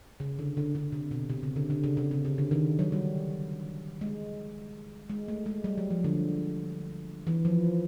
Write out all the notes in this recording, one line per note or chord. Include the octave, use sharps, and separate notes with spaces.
C#3
D3
D3
D3
C3
B2
C3
C#3
D3
D3
C#3
C3
C#3
C#3
D3
D#3
F#3
G3
G#3
G#3
A3
G#3
G3
F#3
F3
D3
E3
F3